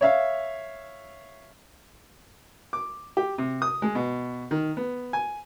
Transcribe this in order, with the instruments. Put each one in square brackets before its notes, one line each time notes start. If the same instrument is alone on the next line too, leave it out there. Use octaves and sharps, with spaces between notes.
[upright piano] C#5 E5 F5
[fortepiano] D6
G4
C3
D#6
G#3
B2
D#3
B3
G#5